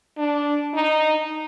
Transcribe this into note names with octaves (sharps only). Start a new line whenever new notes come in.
D4
D#4